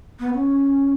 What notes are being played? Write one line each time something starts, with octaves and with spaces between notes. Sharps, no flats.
B3
C#4